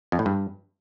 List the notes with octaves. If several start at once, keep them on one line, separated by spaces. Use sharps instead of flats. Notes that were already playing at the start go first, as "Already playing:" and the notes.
F2
A2
G2